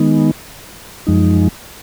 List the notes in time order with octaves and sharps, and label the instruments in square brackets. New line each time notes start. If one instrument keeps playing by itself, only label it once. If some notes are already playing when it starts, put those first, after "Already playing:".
Already playing: [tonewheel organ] D#3 G#3 B3 D#4
F#2 F3 G#3 D#4